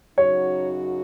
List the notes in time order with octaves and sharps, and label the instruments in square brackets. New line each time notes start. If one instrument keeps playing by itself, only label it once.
[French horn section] F#2 C#3 F#3 D#4 F#4 [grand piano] C#5